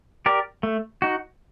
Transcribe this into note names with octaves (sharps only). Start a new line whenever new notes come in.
G4 A#4 D5
A3
D#4 F#4